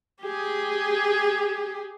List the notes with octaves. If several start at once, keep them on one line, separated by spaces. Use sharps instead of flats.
G4 G#4